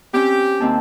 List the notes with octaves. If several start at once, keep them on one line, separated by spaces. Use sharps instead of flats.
C4 C#4 G4
D#2 C4 A5